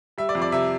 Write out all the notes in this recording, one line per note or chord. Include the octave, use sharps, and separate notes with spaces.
G3 E5
D5
F2
D5
C3 E5